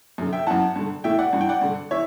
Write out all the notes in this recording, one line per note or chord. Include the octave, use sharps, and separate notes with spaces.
F#2 D3
E5 G5
F#2 E3 F#5 A5
G2 D3
A2 E3 E5 G5
D5 F#5
G2 E3 F#5
G5
D5 F#5
G2 D3
E3 C#5 E5